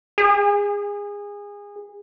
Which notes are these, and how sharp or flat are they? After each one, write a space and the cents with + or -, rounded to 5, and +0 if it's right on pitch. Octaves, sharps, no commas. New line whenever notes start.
G#4 -25